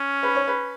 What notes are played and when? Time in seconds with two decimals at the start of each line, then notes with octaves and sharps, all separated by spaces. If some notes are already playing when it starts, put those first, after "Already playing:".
Already playing: C#4
0.23 B4
0.35 C#5
0.48 B4